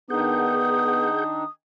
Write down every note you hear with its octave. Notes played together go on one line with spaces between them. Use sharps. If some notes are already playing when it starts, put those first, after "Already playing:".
D#3 B3 D4 D#4 G#4 F#5 D#6 G6